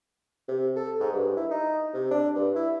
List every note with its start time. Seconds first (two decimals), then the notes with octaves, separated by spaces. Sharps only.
0.48 C3
0.76 A4
1.00 G#2
1.13 G2
1.37 E4
1.51 D#4
1.94 C3
2.11 D4
2.36 G2
2.55 E4